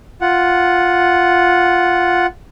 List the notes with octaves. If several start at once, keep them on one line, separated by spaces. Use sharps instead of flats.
F4 F#5